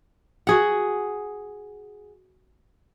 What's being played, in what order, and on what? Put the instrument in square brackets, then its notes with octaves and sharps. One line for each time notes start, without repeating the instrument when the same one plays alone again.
[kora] F#4 G#4 F#5